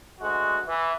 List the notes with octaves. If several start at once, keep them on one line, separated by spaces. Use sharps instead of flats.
D2 G#3 F#4
E3